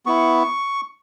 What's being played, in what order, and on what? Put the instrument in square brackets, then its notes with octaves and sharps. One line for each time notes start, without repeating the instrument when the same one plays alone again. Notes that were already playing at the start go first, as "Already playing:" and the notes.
[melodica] B3 E4 C#6